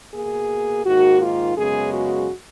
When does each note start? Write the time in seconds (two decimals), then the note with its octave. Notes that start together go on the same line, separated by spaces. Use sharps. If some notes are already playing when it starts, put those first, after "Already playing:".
0.13 B2 A#3 G#4
0.85 G#2 D#3 A#3 F#4
1.21 F4
1.56 F#2 C#3 G#3 B3 G#4
1.93 F#4